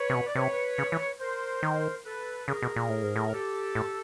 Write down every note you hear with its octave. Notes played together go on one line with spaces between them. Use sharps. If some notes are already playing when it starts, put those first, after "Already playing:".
Already playing: B4 C#5
C3
B2
D5
C3 B4 C#5
C#3
E3
A#4 C5
D#3
A4 B4
C#3 G#4 A#4
B2
A#2
A2
G#2
A2
A#4
G4 A4
A2